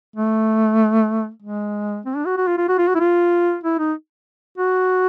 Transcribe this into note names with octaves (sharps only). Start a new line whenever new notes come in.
A3
G#3
C4
D4
F#4
F#4
F4
F4
F#4
F4
F#4
E4
F4
E4
D#4
F#4